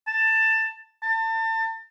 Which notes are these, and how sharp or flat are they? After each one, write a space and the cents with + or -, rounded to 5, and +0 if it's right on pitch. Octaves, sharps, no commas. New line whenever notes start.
A5 +15
A5 +35